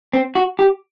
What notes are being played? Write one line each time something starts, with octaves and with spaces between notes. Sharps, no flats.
C4
F#4
G4